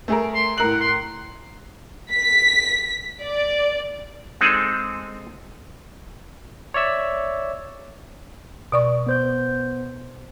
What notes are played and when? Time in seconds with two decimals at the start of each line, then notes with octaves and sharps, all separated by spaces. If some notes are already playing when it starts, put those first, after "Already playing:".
0.08 A3 G#4 A#4
0.35 C6
0.58 A2 A#4 F#5 F#7
0.81 C6
2.13 B6
3.22 D5
4.41 G#3 C4 D#4 G#4 A4
6.74 C#5 D5 E5 E6
8.72 B2 D5 C#6
9.06 B3 C5 G6